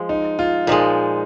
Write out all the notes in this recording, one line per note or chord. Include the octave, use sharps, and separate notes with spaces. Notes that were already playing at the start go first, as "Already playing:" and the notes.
Already playing: F3 G#3
D#4
F4
A#2 F3 G#3 D#4